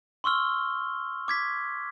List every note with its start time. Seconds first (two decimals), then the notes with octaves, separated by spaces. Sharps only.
0.24 C6 C#6 E6 F6 G7
1.28 D6 G#6 B6